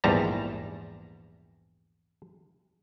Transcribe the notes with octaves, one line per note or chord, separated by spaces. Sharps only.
A#1 E2 G#2 G3 A5 A#5